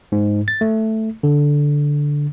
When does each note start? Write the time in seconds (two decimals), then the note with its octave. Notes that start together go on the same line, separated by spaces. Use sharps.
0.12 G#2
0.48 A6
0.61 A3
1.23 D3